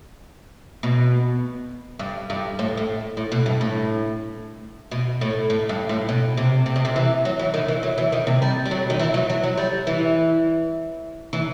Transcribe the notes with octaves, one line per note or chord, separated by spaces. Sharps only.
B2
G2
G2
A2
A2
A2
B2
G2
A2
B2
A2
A2
G2
A2
B2
C3
C3
B2
C3
E3
F#3
E3
D#3
E3
F#3
E3
D#3
C3
G3
G3
F#3
D#3
E3
F#3
F#3
F#3
G3
E3
E3